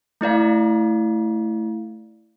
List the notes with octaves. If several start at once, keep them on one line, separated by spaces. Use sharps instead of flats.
A3 E4 D5 F5